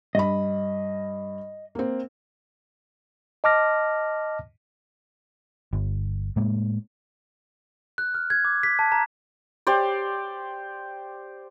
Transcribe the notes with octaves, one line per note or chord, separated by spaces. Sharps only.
G2 D#5 B5
A#3 C4
D#5 A5 D6 F6 A#6
G1
A2 G#3 A#3
F#6
F6
G#6
D6
B6
A5
A#5
G4 C5 D5